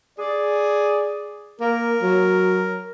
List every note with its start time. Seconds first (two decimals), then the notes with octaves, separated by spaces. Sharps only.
0.18 G#4 D5
1.60 A#3 A#4
2.02 F#3